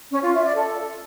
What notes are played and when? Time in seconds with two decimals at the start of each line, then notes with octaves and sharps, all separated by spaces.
0.11 C#4
0.22 F4
0.33 E5
0.44 D5
0.55 A4